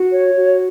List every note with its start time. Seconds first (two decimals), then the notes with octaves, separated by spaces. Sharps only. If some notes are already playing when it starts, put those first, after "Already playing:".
Already playing: F#4
0.11 C#5
0.36 F#4